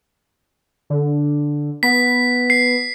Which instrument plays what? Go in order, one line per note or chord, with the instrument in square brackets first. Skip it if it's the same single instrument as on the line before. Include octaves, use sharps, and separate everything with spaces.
[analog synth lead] D3
[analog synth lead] B3 [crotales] B6
[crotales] C7